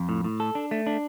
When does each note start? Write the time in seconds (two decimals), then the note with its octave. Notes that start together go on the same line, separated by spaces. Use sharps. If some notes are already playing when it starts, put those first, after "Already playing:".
Already playing: F2
0.09 A2
0.24 A2
0.40 A4
0.55 D4
0.71 A3
0.87 D4